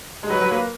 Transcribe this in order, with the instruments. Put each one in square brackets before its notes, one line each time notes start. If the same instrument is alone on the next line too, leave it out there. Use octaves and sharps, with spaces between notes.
[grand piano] G#3
[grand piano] F#3 [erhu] B4
[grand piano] F#3
A#3